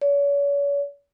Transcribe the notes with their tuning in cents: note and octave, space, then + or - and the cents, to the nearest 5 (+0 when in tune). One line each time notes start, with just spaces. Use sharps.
C#5 +40